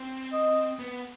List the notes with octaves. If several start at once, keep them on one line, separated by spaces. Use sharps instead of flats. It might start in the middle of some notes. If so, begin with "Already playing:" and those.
Already playing: C4
D#5
B3